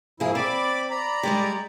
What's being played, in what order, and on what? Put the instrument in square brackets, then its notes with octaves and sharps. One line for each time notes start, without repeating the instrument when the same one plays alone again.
[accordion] G#2 F3 E4 [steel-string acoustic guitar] A#3 G#4
[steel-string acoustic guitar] C4 [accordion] D5 B5 D6
[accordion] D5 A#5 B5
[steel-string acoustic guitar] G3 G#3 G4